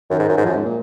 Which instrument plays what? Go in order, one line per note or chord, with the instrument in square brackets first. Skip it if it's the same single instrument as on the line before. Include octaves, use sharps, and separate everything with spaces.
[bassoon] F#2 [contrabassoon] D#3
[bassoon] G#2
F#2
G#2
[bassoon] F#2 [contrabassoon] F3
[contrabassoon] G#2
A#2